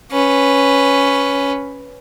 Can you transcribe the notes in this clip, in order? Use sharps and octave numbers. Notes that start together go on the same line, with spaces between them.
C#4 B4